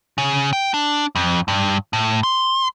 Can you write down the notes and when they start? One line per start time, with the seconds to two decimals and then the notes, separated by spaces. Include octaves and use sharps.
0.18 C#3
0.53 G5
0.74 D4
1.15 F2
1.48 G2
1.93 A2
2.23 C6